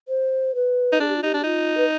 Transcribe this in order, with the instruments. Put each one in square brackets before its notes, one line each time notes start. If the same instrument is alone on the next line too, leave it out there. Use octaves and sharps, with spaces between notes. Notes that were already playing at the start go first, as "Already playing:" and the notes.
[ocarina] C5
B4
[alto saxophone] D#4
[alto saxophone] D4 [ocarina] G#4
[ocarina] G4
F4
[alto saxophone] D#4 [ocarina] G4
[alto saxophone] D4
[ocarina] G4
[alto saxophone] D#4 [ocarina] F4
[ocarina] B4